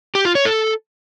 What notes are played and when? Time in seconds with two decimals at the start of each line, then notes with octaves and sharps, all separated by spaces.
0.15 G4
0.25 F4
0.35 C#5
0.45 A4